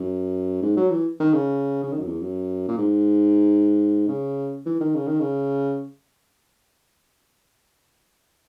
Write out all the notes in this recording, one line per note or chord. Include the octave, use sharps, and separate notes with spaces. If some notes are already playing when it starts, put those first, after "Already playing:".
Already playing: F#2
G#2
F#3
E3
D#3
C#3
C#3
D#3
F#2
E2
F#2
A#2
G#2
C#3
E3
D#3
C#3
D#3
C#3